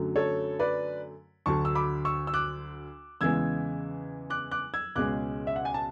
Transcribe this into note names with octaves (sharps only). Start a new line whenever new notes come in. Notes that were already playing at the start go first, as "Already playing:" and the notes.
Already playing: F#2 D3 F#3 A3
A4 C#5
B4 D5
D2 D3 F#3 A5 C#6
E6
B5 D6
C#6 E6
E6
D6 F#6
E2 C#3 E3 G#3 E6 G#6
D6 F#6
D6 F#6
E6 G#6
C#2 B2 G#3 C#4 D6 F#6
E5
F#5
G#5
A5